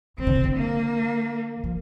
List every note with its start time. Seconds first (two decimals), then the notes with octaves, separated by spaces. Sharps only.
0.18 E3 C4
0.27 D3
0.35 C3
0.44 D3
0.56 A#3
1.64 F3